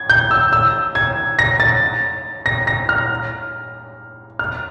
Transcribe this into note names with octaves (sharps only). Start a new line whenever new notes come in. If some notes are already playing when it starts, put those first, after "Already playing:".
Already playing: G#6
G6
E6
E6
G#6
A#6
A6
A#6
A#6
F6
F6